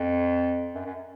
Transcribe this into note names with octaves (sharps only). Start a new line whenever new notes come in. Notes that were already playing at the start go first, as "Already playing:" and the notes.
Already playing: F2
F#2
F#2